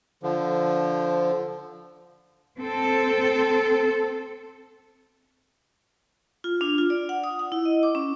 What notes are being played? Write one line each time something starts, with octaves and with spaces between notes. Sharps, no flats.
D3 F3
C4 A4
F4
D4
F4
D5
F#5
D#6
F#5
E4
D#5
D6
C#4